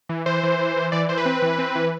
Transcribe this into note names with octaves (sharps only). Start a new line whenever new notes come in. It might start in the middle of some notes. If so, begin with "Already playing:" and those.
E3
E3 C5
E3
E3
E3
E3 D5
E3 C5
B4
C4
E3
C4
E3